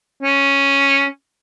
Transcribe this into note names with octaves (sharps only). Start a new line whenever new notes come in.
C#4